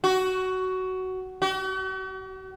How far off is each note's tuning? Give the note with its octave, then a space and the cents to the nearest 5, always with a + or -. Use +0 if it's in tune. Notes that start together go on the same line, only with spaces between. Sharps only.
F#4 +15
F#4 +45